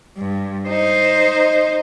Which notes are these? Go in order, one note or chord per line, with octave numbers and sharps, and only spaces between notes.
G2
D#4 C5